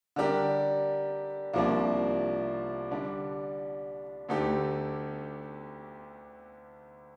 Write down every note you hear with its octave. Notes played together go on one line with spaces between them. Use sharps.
D3 G3 D4 G4 A#4
C2 C3 F3 A#3 D4
D3 G3 D4
D2 D3 A3 D#4 G4